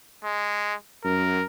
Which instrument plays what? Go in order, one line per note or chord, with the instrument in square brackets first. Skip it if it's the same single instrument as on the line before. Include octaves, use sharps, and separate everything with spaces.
[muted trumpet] G#3
[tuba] F#2 [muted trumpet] A#4